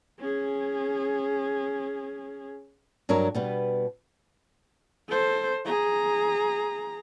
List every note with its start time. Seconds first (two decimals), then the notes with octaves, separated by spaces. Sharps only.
0.20 C#4 G#4
3.09 G2 F#3 D4 A#4 C#5
3.35 B2 G3 B3
5.09 A4 C5
5.65 G#4 A#5